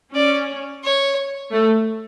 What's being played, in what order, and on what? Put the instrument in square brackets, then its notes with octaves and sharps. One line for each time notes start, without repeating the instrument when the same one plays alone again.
[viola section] C#4 [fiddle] D5
[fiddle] C#5
[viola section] A3